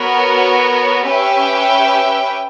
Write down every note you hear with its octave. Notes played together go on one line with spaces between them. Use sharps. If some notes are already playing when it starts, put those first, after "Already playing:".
Already playing: B3 F#4 A#4 C#5
C#4 G4 B4 E5 G5